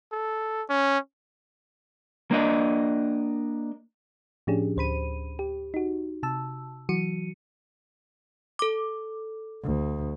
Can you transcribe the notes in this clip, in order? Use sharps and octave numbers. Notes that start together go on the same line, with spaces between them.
A4
C#4
A#3 D4 D#5
A2 F3 C#4 D4 G4 G#4
D2 C5 B5 D#7
G4
D#4 F#4
C3 A5 E6
E3 F#3 F#4 C#7 D#7
A4 D6
D2